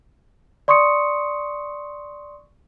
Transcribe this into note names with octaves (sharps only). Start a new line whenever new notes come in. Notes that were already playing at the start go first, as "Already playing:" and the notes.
D5 C6 C#6 D#6 C#7